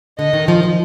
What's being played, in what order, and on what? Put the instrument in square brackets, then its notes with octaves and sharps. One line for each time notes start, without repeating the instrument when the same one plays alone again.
[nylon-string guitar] D3 [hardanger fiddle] D#5
[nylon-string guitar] D#3
F3
F3